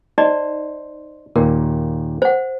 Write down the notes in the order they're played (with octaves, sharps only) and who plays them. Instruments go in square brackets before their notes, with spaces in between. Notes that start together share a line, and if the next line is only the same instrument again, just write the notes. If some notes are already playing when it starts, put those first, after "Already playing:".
[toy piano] D#4 D5 D#5 [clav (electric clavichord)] C5
[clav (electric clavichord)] D#2 A#2 [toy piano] A#4
[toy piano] C5 F#5